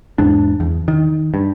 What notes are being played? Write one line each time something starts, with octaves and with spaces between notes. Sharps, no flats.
E2 G#2 D4
E2
D#3
G2